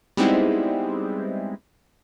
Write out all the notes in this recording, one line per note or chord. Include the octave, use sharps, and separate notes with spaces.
G3 G#3 B3 C4 D#4 E4